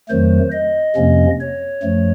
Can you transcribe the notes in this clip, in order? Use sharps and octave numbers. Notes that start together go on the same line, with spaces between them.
F2 D#3 F#3 A3 C5
D#5
F2 C3 F3 A#3 C#4
C#5
F#2 F3 A3